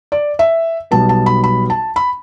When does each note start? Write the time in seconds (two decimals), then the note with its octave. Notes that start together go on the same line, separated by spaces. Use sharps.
0.12 D5
0.39 E5
0.91 B1 B2 G3 B3 A5
1.09 A5
1.26 B5
1.44 B5
1.70 A5
1.96 B5